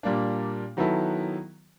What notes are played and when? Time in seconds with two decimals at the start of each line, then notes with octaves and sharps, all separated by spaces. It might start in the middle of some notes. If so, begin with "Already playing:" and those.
0.03 A#2 G3 A#3 D4
0.77 D#3 F#3 B3 E4 A4